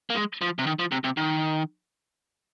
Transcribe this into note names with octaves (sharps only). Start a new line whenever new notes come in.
A#3
G#3
F3
C3
D#3
F3
C3
C3
D#3